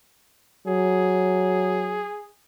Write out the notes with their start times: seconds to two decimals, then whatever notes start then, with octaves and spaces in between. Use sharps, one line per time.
0.67 F#3 G#4